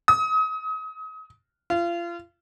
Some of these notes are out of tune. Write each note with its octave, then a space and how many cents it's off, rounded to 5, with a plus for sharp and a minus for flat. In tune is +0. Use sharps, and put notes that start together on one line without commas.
D#6 +35
F4 -30